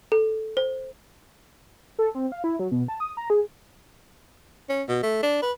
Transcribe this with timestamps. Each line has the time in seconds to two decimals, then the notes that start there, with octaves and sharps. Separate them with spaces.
0.12 A4
0.57 C5
1.99 A4
2.15 C4
2.32 F5
2.44 E4
2.59 F#3
2.72 B2
2.88 A5
3.00 D#6
3.17 A#5
3.30 G#4
4.69 C#4
4.88 B2
5.03 A3
5.23 D4
5.42 B4